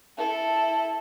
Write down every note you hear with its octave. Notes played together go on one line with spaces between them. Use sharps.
E4 A4